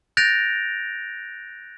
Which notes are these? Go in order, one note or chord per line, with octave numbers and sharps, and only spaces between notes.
F#6 G6 A6 A#6 D7 F7